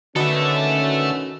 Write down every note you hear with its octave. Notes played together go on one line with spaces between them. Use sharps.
D3 D#3 C#4 F#4 A4 B4 D#5 E5